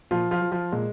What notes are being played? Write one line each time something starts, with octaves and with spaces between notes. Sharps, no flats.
A#2 F3 F4
F3 F4
F3
F3 F4
A#2 G#3